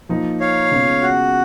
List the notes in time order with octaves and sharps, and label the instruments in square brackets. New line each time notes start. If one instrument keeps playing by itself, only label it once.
[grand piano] F3 A#3 D#4
[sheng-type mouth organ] C#5 F5
[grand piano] C#3 G#3 B3 F4
[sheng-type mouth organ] F#4